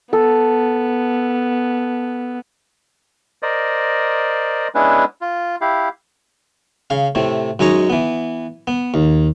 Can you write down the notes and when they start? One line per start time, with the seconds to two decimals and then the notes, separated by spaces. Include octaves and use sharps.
0.13 B3 A4
3.43 A#4 C5 D5 D#5
4.75 G#3 B3 C#4 D4 E4 B4
5.21 F4
5.61 E4 G4 F5
6.90 C#3 F5
7.15 A2 C3 A3
7.59 F#2 G#3 D#4 C#5 A#5
7.90 E3 B3
8.67 B3
8.94 D#2